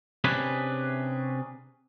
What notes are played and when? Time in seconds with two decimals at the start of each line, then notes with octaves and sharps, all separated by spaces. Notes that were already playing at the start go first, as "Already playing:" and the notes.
0.24 C3 C#4 D4 G#4 B4